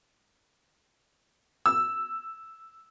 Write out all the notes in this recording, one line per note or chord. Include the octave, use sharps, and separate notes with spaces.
E6